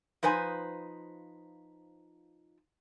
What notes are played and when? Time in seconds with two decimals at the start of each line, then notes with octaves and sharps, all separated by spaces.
0.23 F3 D#4 B4 C5 G#5